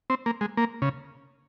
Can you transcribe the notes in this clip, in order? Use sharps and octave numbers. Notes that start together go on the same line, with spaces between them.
C4
A#3
G#3
A#3
C#3